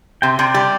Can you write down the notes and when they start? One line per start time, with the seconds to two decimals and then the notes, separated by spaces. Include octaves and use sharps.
0.22 C3 G5
0.39 C3 D5 G5
0.54 G3